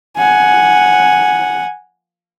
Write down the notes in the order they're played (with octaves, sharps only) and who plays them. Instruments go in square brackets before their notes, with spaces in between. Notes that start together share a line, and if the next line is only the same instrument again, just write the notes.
[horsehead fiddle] F#5 G#5